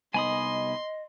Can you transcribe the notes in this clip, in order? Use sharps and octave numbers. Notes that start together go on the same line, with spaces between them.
C2 B3 D#4 D#5 G#5 B5 C6 D#6